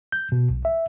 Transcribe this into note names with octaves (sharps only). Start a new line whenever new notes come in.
G6
B2
B1
E5